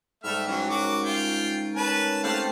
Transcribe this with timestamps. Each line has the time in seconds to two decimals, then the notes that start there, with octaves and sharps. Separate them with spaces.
0.24 G#2 G3 A3 E5 A5 F6
0.47 E3 F#3 C#4
0.70 F#4 A#4 D6
1.05 F4 G5
1.76 C#4 A#4 B4 A5
2.24 A3 C4 G4 F5 F#5 A5